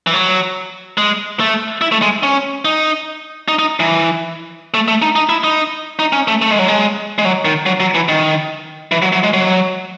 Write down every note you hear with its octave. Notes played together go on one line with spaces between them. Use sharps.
E3
F#3
G#3
A3
E4
A3
G#3
C#4
D#4
D#4
D#4
E3
A3
A3
D#4
D#4
E4
D#4
D#4
C#4
A3
A3
G#3
F#3
G#3
G#3
F#3
D#3
F#3
F#3
E3
D#3
E3
F#3
F#3
G#3
F#3